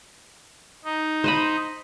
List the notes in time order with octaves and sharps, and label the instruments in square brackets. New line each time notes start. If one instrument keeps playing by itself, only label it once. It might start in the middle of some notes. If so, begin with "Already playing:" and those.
[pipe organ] D#4
[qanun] C5 D#5 B5